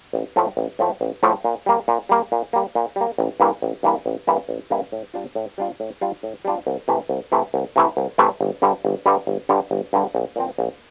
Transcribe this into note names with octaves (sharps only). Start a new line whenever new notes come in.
A1
A2 F3 A3
A1
A2 F3 A3
A1
A2 F3 A3
A#2
G3 A#3
A#2
G3 A#3
A#2
G3 A#3
A#2
G3 A#3
A1
G2 E3 A#3 E4
A1
G2 E3 A#3 E4
A1
G2 E3 A#3 E4
A1
G2 E3 A#3 E4
A2
G3 D4 F4
A2
G3 D4 F4
A2
G3 D4 F4
A2
G3 D4 F4
C2
C3 E3 A3 E4
C2
C3 E3 A3 E4
C2
C3 E3 A3 E4
C2
C3 E3 A3 E4
G1
G2 D3 G3
G1
G2 D3 G3
G1
G2 D3 G3
G1
G2 D3 G3
A#1
A#2 F3 C4
A#1